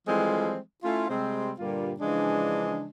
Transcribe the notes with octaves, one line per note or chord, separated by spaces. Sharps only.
E3 F3 G3 G#3 C4 A4
A3 C#4 E4 F4
C3 G3 G#3 C4
G2 A#2 D3 G3 A#3 F4
C#3 E3 F3 G#3 D4